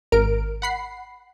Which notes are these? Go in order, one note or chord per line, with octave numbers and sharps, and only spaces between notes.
G#1 A#4 F6 D7
F#5 B5 C7